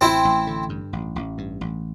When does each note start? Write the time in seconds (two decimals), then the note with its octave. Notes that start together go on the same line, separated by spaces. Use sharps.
0.01 A1 C4 E4
0.25 A1
0.47 D3
0.69 G2
0.93 A1
1.16 A1
1.38 G2
1.61 A1